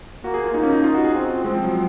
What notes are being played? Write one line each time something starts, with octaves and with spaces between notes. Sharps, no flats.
A#3 F#4
G#4
F4
A#3 D#4
C#4
D#4
D#4 F4
F#4
G#4
C4 F4
G#3 C4
F3
F#3